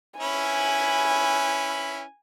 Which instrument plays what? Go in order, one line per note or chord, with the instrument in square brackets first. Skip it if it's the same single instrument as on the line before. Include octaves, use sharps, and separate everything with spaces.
[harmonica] C#4 E4 B4 [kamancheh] G#5